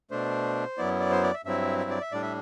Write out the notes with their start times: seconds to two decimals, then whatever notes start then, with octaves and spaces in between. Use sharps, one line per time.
0.11 B2 A3 D4 C5
0.78 F#2 F#3 B3 E4 D5
1.00 D5
1.11 C5
1.23 D5
1.34 E5
1.45 G2 F#3 C4 E4 E5
1.78 E5
1.90 D5
2.01 E5
2.12 A2 G3 D4 D5
2.23 E5